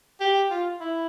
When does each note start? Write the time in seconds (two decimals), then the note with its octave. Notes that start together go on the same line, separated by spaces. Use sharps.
0.20 G4
0.50 F4
0.80 E4